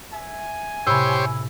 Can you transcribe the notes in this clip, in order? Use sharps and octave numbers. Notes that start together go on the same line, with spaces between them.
E5 G#5
A2 C3 G4 C5 C#5 B5 E6